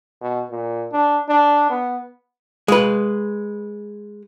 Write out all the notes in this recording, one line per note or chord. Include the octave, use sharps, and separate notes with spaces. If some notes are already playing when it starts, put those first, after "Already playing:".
B2
A#2
D4
D4
B3
G#3 B4